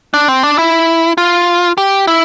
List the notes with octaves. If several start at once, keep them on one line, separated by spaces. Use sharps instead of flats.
D4
C4
D4
E4
F4
G4
E4